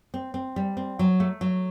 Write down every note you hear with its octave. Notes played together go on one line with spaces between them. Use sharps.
C4
C4
G3
C4
F#3
A3
F#3